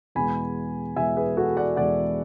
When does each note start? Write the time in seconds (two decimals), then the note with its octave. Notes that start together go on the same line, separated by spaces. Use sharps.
0.15 E2 B2 G#3 B3 G#5 B5
0.96 E2 B2 G#3 B3 E5 G#5
1.16 G#4 B4
1.37 F#4 A4
1.57 D5 F#5
1.76 E2 B2 G#3 B3 D5 F#5